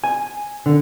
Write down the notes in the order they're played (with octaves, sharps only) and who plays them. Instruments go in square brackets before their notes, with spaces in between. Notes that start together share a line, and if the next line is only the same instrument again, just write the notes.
[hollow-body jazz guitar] G#5
D3